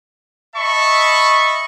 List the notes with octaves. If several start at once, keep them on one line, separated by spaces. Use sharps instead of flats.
D#5 E5 A5 B5 C#6